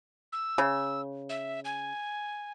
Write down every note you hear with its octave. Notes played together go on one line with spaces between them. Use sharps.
E6
C#3
E5
G#5